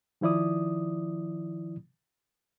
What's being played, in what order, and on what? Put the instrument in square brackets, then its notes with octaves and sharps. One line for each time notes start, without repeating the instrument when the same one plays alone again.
[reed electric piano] D#3 F3 E4 D5 D#6